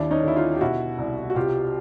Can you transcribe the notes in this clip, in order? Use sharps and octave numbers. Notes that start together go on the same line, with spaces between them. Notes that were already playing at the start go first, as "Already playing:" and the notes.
Already playing: D#2 D4 E4
C#4 D#4
D3 E4
D#4 F4
G4
B2 E4 F#4
C2
F#4
C3 F4 G4